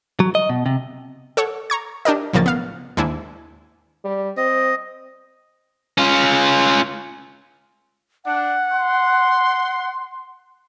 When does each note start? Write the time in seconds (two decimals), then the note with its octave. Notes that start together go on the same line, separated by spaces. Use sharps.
0.20 F#3
0.35 D#5
0.49 B2
0.66 C3
1.37 A4 C#5 F#5 C#6
1.70 A#5 C#6 G#6
2.05 D4 G4 A#4 D#5
2.33 B1 A2 C#3 F3 A#3 A6
2.46 B3 F5
2.97 D#2 G#2 D4 E4 G#5
4.04 G3
4.37 C4 D#5
5.98 C#4 F4
8.25 D4 F#5
8.72 C6